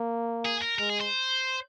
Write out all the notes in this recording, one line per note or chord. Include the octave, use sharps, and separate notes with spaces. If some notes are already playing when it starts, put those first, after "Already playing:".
Already playing: A#3
G#4
A#4
G#3 A#4
G#4
C5